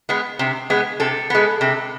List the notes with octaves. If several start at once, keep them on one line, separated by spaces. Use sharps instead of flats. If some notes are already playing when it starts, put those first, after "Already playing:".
G#3 B3
C3
G#3 B3
C3 A4
G#3 B3
C3